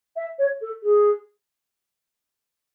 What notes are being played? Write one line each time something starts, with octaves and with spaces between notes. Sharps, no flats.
E5
C#5
A4
G#4